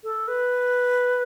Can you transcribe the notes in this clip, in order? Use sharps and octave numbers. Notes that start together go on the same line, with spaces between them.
A4
B4